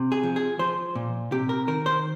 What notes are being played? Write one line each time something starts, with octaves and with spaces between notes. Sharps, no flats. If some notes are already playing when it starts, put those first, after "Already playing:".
Already playing: C3
G#4
F3
G#4
F3 C5
A#2
C3 G4
A#4
D#3 A#4
C5